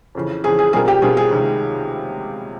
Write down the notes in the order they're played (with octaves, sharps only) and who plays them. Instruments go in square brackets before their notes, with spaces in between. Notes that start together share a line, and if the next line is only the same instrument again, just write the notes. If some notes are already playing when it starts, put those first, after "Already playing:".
[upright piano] F2 C#3 E3
[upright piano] F2 C#3 E3 [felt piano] G#4
[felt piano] G#4
[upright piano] B2 G3 C4 F4 A#4 [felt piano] G#4
[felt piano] G4
[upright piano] B2 G3 C4 F4 A#4 [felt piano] G#4
[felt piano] G#4
[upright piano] C#2 C3 D#3